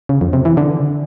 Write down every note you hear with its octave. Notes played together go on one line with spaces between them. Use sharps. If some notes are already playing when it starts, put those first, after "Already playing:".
C#3
F2
C3
E3
D3